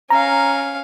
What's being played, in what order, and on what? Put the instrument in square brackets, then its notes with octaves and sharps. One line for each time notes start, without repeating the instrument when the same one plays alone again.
[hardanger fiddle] C#4 F5 [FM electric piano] A#5